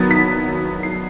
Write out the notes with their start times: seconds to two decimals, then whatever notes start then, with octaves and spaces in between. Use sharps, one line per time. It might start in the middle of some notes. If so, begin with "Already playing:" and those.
Already playing: D#3 F#3 B3 A6
0.11 B6
0.83 C7